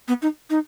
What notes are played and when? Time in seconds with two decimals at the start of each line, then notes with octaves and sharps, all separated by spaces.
0.08 B3
0.22 D#4
0.50 D#4